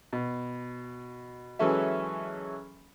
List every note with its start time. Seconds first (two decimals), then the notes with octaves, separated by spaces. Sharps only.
0.13 B2
1.59 E3 F#3 G#3 C#4 A4 E5